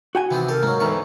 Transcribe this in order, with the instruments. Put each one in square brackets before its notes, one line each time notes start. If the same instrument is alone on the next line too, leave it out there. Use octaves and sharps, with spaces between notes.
[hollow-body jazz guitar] F#4 G5 G#5
[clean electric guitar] C3 D#3 [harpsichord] E3 B3 C4
[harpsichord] G4 A4 [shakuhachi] A#4
[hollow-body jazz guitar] G#2 [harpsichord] F#3 A#3
[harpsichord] D2 E3 C#6 [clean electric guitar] B3 D#4 A#5